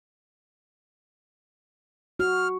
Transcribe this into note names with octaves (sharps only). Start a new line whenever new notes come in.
F#4 F6